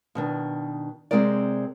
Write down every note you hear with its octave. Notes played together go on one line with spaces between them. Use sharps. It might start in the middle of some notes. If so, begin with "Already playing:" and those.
B2 D#3 D4
C3 E3 G#3 C4 A#4 D5